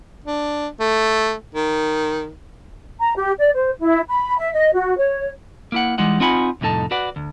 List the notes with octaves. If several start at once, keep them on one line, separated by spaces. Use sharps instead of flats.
D4
A3
D#3
A#5
G4
D5
C5
E4
B5
E5
D#5
F#4
C#5
A#3 E4 F#5
E3 G3 G#3 D#4 F#5
C4 D#4 F4 F#5 G#5 B5
C2 F2 A2 D#4 A4 A5
F#4 B4 D5 F#5
D2